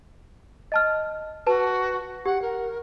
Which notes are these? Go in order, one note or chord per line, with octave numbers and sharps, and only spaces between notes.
D#5 A5 F6
F#4 B4 A5
G4 F#5
A#4